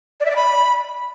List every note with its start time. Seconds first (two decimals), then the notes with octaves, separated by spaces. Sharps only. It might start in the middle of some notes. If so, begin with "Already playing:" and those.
0.20 D5
0.25 E5
0.30 D5
0.35 B5